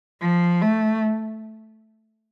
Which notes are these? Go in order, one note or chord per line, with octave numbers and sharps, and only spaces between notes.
F3
A3